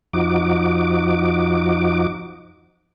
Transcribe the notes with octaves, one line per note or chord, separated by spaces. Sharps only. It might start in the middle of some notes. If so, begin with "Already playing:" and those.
F2 F3 D#4 F#4 D6